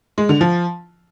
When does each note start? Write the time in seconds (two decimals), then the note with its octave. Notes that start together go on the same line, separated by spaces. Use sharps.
0.18 G#3
0.29 D3
0.41 F3